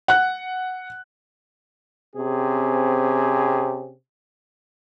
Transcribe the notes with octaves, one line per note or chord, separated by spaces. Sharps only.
F#5 F#6
C3 C4 C#4 G#4